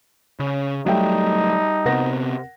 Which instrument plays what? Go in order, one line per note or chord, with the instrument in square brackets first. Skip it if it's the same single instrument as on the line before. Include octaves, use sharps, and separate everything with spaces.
[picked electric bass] C#3
[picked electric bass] F#3 A3 [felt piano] G3 E5 G5 [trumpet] D#4
[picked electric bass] C3 B3 [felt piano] A#4 F#5 A#6